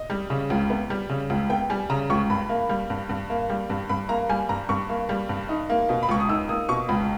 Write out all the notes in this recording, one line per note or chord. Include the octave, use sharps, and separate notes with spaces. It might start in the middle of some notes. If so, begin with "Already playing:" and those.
Already playing: D#5
G3
C#3
C#2
B3
G3
C#3
C#2
B3 G5
G3 G#5
C#3 A#5
C#2 C#6
G2 B5
A#3
G3
G2
G2
A#3
G3
G2
G2 B5
A#3 A#5
G3 G#5
G2 A#5
G2 C#6
A#3
G3
G2
D#4
A#3
B2
B5
C#2 C#6
D#6
D#4 E6
A#3 D#6
B2 C#6
C#2 B5